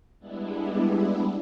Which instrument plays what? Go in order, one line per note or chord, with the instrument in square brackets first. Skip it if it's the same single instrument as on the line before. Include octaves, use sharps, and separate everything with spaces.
[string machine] G3 G#3 B3 D4 E4